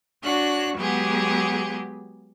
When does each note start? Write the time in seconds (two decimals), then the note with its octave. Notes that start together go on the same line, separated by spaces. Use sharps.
0.23 D4 F#4 C#5 F#6
0.76 F#3 G#3 B3 G4 G#4